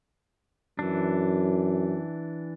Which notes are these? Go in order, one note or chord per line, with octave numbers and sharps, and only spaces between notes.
F#2 E3 D4